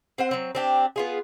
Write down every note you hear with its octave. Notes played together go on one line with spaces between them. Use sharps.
C4 C5 F#5
F#3 C4
C4 D4 G4
B3 F4 G#4